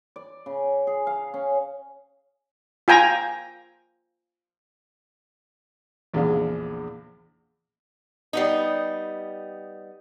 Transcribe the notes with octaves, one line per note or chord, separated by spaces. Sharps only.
D5
C#3
G#4
F5
C#4
F4 G5 G#5 A#5
A#1 E2 C#3 G#3 D4 F5
G3 B3 D#4